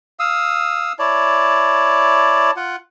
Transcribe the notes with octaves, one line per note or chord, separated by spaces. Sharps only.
F5 D#6 E6
E4 C#5 D5 A5
F4 F#5